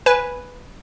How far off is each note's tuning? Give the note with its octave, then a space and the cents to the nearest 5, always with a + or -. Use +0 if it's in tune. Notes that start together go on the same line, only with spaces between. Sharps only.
B4 +0 G#5 +0